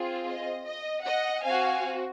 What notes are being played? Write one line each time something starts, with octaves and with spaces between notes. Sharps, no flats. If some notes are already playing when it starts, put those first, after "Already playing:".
Already playing: C4 F4 G#4
D#5
D#5
D#5 F#5
C4 F#4 F5 G#5